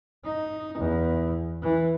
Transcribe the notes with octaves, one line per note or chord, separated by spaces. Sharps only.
D#4
E2
E3